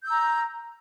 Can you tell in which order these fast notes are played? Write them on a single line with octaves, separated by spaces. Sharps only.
G6 E6 A#5